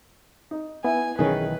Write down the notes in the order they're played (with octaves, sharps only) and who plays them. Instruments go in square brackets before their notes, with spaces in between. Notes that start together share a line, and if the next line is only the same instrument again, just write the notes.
[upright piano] D#4
[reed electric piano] B3 [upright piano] E4 [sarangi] G#5
[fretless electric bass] B1 D#3 E3 [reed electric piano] C#4 G#4 [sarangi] B4